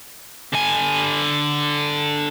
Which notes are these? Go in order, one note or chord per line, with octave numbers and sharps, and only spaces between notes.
D3 G#5